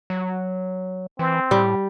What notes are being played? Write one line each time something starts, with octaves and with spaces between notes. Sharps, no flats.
F#3
E3 C4
A2 G3